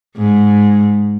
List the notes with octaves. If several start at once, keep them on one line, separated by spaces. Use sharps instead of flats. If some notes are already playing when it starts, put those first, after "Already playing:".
G#2